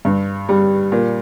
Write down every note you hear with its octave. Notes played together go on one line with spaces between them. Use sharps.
G2
G3
A#2